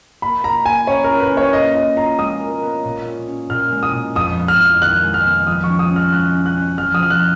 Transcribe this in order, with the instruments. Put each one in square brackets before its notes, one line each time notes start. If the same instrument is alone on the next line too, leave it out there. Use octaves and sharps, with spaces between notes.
[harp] A#3 [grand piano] B5
[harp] A#3 [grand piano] A#5
[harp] A#3 [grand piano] G#5
[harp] C#4 [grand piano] C#5
[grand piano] A#4
[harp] F4
[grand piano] B4
[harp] A#3
[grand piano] C#5
[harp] F4 [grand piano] D#5
[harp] F4 [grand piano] D#5
[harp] F4 [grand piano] A#5
[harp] G#3 [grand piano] D#6
[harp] A#4
B3
A#2
C#4
C#4
[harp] A#2 [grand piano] F6
[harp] G#3
[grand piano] D#6
[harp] A#2
[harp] F2 [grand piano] D#6
[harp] B3
[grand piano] F6
[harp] F2
[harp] D#3 [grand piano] F#6
[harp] G#3
[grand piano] F6
[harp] B3
[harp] F3 [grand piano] D#6
[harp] C#4 [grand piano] C#6
[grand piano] D#6
[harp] C#4
[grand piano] F6
[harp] G#3 [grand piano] F#6
[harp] C#4
[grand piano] F#6
[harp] C#4
[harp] F3 [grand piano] F6
[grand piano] D#6
[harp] F3 [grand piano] F6
[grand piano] F#6